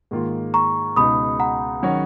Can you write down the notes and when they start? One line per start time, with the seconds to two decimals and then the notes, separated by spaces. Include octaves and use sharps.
0.11 G#2 D#3 A#3 F4
0.54 A#5 C#6
0.96 C#2 B2 G#3 D#4 G#4 B5 D#6
1.40 F#5 A#5
1.82 D#3 F#3 C#4 F#4 C#5